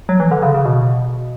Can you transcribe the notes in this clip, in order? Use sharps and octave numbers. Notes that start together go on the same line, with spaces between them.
F#3
E3
D3
C#3
C#3
B2